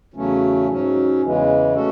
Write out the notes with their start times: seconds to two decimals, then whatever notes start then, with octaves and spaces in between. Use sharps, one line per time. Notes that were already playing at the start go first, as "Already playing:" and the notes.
0.14 E2 C#3 F#3 A3 C#4
0.69 G#2 F#3 C#4
1.22 E2 C#3 E3 G#3
1.76 A3 C#4 F#4 A4